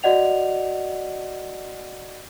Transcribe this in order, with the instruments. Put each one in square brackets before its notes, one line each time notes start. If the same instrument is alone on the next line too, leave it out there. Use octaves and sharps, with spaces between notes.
[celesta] F#4 D5 D#5 F#5 F7